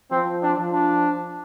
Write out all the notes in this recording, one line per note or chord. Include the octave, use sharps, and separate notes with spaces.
F3 C4
D4
F3
D4